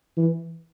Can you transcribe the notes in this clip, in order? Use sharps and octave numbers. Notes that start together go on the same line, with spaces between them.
E3